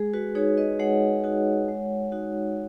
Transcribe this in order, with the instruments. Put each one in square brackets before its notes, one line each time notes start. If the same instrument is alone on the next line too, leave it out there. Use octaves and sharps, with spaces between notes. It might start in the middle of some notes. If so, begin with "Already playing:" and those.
Already playing: [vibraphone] G#3 G#4
F#4 B4
D#4 F#4 G#4 C#5
B4 D#5
G#3 C#5 F#5
D#4 F#4
G#3
D#4 F#4